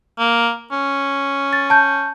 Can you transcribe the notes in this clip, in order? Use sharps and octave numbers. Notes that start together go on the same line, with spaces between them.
A#3
C#4
A6
A5 G6